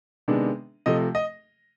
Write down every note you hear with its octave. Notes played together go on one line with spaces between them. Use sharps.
C3 D#3 G#3 B3 D4
C3 F3 A3 D#5
D#5